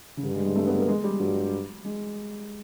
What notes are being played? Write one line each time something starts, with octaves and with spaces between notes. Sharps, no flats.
C#3
G2 D3
G#3
G#3
A3
B3
A#3
G#3
G3
G2 F#3
G#3